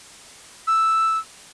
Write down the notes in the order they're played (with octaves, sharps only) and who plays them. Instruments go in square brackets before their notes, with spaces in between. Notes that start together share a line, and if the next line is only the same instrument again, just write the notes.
[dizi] E6